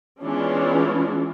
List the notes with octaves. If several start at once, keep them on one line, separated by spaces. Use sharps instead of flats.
E3 G#3 B3 C#4 D4 F4